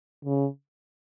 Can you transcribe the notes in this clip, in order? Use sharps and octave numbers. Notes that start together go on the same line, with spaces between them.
C#3